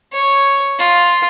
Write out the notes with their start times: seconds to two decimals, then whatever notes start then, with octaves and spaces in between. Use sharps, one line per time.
0.13 C#5
0.79 F4